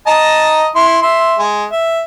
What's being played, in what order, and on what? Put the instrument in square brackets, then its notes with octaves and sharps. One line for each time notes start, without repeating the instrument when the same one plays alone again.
[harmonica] D#5 A5 A#5
E4 C6
E5 C6
G#3
E5